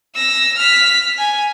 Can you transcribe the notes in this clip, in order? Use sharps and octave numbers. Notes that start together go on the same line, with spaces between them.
E6 A#6
F6 B6
G#5